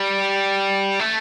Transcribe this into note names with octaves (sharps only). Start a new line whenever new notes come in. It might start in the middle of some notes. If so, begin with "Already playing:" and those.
Already playing: G3
A3